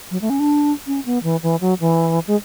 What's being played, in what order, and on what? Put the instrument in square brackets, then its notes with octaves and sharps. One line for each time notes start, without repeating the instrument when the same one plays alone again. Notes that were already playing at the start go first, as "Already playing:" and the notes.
[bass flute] F#3
A3
C#4
D4
C#4
B3
E3
E3
F#3
E3
G#3